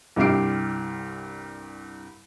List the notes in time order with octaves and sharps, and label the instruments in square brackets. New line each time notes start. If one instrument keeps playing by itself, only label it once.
[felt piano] C2 G2 G4 E5 C7 D7